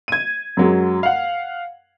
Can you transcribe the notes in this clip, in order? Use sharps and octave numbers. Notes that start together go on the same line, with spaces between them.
G#6 D#7
F#2 F#3 G#3
F5 F#5